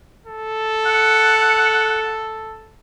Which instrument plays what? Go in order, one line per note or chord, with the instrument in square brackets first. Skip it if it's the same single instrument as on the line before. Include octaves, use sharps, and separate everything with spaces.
[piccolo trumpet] A4
[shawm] F#5